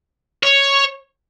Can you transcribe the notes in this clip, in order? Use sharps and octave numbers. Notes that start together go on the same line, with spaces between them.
C#5